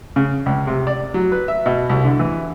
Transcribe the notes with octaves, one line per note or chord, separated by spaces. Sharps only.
C#3
C#2
C3
D5
F#3
B4
E5
B2
C2
D3
E3